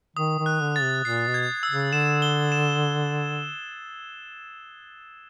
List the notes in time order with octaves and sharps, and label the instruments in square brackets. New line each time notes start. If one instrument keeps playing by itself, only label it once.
[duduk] D#3 [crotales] D#6
[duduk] D#3
[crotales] F#6
[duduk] D3
[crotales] A6
[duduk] C3
[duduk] A#2 [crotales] C7
[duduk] B2
[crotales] G#6
E6
[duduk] C#3
[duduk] D3 [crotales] E7
[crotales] G7
E7